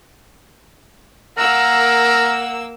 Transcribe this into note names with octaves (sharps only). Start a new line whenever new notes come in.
A#3 A#4 F#5 E6